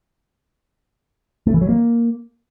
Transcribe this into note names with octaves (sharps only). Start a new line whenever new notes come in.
A3
E3
F#3
A#3